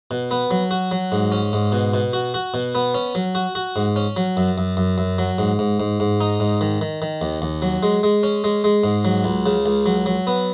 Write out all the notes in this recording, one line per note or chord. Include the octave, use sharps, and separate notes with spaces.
B2
B3
F#3
F#4
F#3
G#2
C#4
G#2
B2
B2
F#4
F#4
B2
B3
C#4
F#3
F#4
F#4
G#2
C#4
F#3
F#2
F#2
F#2
F#2
F#3
G#2
G#2
G#2
G#2
D#4
G#2
D#3
D#3
D#3
D#2
D#2
F#3
G#3
G#3
C#4
G#3
G#3
G#2
F#3
C#2
C#3
C#2
F#3
F#3
B3